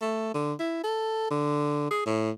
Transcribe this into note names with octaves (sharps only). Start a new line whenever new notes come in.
A3
D3
E4
A4
D3
G#4
A2